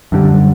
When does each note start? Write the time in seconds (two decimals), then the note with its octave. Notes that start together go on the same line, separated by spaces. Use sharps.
0.12 F#2 D3 G3